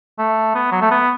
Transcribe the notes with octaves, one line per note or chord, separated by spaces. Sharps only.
A3
B3
F#3
A3
B3